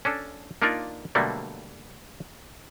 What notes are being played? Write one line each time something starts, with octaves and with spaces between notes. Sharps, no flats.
C#4 D4 A4
A#3 D4 D#4 F4 A#4 D5
B2 D3 F#3 G3 A3 A#3